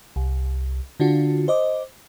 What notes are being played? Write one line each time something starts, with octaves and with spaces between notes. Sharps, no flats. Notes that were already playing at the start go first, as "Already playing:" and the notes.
C2
D3 D4 F4 F#4
C5 D#5 D6